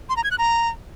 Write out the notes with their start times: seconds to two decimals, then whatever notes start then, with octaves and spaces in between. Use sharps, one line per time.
0.09 C6
0.16 A#5
0.24 G#6
0.31 F#6
0.38 A#5